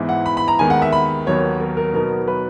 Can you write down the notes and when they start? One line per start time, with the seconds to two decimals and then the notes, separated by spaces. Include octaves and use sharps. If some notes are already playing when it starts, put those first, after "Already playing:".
Already playing: G#2 E3 B3 E4
0.09 F#5
0.26 B5
0.37 B5
0.48 A#5
0.59 D#2 D#3 G#3 B3 G#5
0.70 F#5
0.82 E5
0.93 B5
1.26 D#2 D#3 F#3 B3 C#5
1.60 A#4
1.77 A#4
1.93 B2 F#3 B3 D#4 A#4
2.28 B4